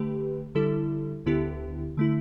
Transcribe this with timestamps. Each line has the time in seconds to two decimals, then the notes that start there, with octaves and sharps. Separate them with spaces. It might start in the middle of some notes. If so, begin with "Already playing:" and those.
Already playing: D3 A3 G4 B4
0.55 D3 G3 E4 A4
1.26 D2 D3 B3 E4 G4
1.97 D3 A3 E4